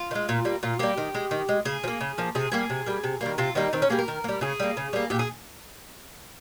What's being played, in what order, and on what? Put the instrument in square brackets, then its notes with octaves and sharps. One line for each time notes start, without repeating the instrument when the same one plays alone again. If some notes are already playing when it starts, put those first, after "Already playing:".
Already playing: [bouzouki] F4
D#3
G#3
A#2
G3 A#3
A#2 F4
G3 A#3 G4
D#3
G#3
D#3
G#3
C#3 G#4
F3
A#3
C#3
F3 A#3
C3 G#4
G3 A#3 G#4
C3
G3 A#3
C3
D#3 G3 A#3
C3 F4
D#3 G3 A#3 D#4
D#3 C4
C#4
G3 A#3 G#4
A#4
D#3
A#3
G3
C#3 G#4
G3 A#3
C#3
G3 A#3
A#2 G4
G#4